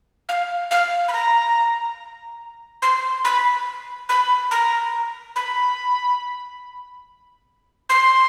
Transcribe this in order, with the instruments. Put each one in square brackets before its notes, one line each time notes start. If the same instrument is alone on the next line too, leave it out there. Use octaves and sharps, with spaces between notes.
[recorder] F5
F5
B5
A#5
C6
B5
B5
A#5
B5
C6